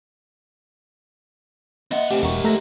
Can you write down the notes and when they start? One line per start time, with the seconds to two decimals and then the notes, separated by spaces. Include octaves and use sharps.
1.91 A#3 D#5 E5 F#5 C6
2.11 A3 C4 G4 B4 G5 G#5
2.23 E1 G4 A#4 F#5 A#5 C#6
2.44 A3 C5 A#5 C6 A#6